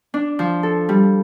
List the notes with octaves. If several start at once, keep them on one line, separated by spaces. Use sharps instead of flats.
D4
F3
A4
G3